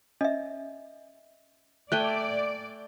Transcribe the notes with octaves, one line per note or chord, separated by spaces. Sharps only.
C#4 D#5 E5
A3 D5 G5 G#5 F#6